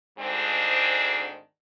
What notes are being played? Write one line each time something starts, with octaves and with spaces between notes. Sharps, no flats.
D2 G#2 D#3 G#3 C4 D4